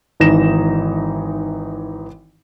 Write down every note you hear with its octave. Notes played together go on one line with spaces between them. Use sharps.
G#1 E3 D#4 A#6 E7